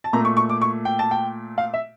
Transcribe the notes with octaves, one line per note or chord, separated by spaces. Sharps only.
A5
A#2 A3 A#5
C#6
C#6
D6
C#6
G5
A5
G5
F5
E5